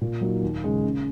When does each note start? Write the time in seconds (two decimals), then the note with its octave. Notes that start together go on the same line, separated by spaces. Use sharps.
0.01 A#2
0.21 F#3 A#3 D#4
0.43 D#2
0.64 C#3 G#3
0.85 C#3